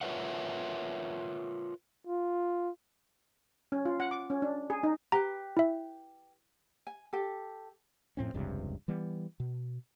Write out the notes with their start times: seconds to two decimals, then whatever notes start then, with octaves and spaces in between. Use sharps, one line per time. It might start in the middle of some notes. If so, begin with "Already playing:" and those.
0.01 F4 A#4 B4 C#5 E5 F#5
2.07 F4
3.72 C#4
3.85 F4
4.00 F#5
4.11 D6
4.30 C#4
4.42 D4
4.70 G#4
4.83 D#4
5.12 G4 B4 G5 A#5
5.57 E4 E5
6.87 G#5
7.13 G4 A4
8.17 F2 A2 C4 C#4
8.34 F1 C#2 G2 C3
8.88 E3 G3 B3
9.40 B2